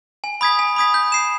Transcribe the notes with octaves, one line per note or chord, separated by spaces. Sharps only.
G#5
B5 D#6 G#6 B6
G#5
B5 D#6 G#6 B6
G6
C7 E7